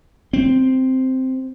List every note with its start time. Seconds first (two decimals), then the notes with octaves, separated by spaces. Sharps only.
0.33 C4